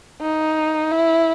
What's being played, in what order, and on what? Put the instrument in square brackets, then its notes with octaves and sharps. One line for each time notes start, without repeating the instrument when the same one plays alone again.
[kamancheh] D#4
E4